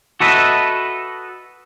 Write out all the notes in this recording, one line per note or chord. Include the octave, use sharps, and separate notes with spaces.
F#4 A4 B4 D#5 E5